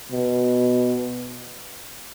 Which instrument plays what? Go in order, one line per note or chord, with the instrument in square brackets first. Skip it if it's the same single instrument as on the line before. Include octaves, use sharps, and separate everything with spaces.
[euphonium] B2